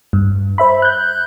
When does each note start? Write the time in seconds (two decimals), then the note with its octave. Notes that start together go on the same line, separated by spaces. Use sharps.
0.13 G2
0.58 C5 E5 B5
0.82 F#6 G6